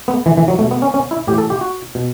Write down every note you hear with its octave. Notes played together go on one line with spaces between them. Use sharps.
B3
E3
E3
F#3
B2 A3
B3
C#4
C#4
E4
A2 E3 G4
A4
G4
F#4
B2